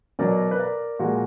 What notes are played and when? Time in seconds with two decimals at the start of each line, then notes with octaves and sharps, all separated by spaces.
0.19 B2 F#3 A#4 D5
0.51 B4
0.59 A#4 D5
0.99 A#2 F3 G#3 F#4 A#4